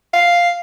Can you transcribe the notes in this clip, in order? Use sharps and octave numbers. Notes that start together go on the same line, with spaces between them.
F5